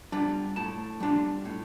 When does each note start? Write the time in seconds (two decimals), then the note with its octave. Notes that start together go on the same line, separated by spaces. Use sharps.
0.12 G3 D4 F4
0.56 A2 A5
1.00 G3 D4 F4
1.45 A2